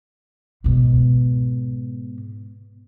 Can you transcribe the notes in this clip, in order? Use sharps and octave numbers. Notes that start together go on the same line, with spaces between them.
G#2 B2